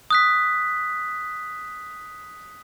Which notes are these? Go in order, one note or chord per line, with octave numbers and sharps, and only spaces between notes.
D#6 F#6 B6